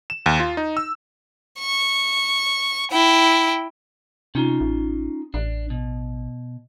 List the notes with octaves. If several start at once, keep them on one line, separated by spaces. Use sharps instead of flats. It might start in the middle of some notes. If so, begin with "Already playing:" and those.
E7
D#2
F4
D#4
E6
C#6
E4 G5
C3 C#4 D#4 F4
A1
A1 D4
B2